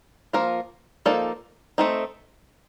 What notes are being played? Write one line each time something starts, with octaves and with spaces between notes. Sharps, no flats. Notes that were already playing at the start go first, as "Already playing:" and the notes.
F3 A#3 F4 A#4
F3 A#3 D#4 A4 D5
A3 C4 D#4